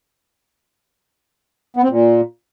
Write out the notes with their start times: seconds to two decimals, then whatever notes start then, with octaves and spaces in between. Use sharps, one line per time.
1.77 B3
1.83 C4
1.90 A#2